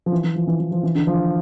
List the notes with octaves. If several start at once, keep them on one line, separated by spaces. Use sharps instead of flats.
F3
E3
E3
F3
E3
E3
F3
E3
D3
F3